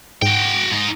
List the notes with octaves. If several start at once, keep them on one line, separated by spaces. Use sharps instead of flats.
G#2 F#4 G5
G#2 D#4